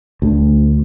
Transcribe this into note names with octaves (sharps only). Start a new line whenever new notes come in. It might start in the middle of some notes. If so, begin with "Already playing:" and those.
D2